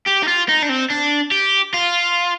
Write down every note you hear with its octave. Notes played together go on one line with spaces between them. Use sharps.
G4
D#4
F4
D#4
D4
C4
D4
G4
F4